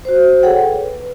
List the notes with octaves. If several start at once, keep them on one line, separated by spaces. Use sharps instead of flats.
F#4 C5
G#4 A4 C#5 F#5 G5
B4